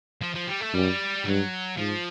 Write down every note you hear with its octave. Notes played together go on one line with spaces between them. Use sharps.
F3
F3
G3
A3
F#2 G3
G2 F#3
G#2 F3